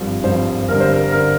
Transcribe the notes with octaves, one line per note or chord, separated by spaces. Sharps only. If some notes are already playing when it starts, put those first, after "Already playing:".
Already playing: G#1 G2 F3
G#1 G2 F3 C5
G1 G2 D3 A#4
C5
A#4
D3 A#4